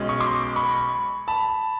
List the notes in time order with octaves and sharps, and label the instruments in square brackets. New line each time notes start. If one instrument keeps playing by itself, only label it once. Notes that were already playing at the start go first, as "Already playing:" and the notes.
Already playing: [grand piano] B1 B2 G#3 C#4
C#6
C6 D6
B5 C#6
A5 B5